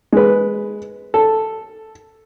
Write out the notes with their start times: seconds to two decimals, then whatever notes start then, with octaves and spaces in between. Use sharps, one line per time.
0.12 G#3 B4
1.14 A4